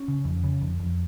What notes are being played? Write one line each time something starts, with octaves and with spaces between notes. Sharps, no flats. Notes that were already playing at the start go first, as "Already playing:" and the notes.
Already playing: C#4
C#3
F2
C#3
F2
F2